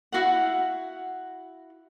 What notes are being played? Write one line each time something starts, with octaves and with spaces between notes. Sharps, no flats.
E4 F#4 F5 F#5